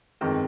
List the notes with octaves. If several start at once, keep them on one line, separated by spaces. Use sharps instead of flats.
G1 F2 D#3 G#3 C4